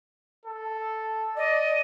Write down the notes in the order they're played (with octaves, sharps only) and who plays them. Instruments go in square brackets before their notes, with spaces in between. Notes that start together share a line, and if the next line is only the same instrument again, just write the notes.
[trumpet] A4
[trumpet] D5 [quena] D#5